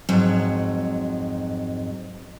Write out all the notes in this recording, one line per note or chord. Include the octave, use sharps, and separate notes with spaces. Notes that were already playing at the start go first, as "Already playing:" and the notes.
F2 G#2 F#3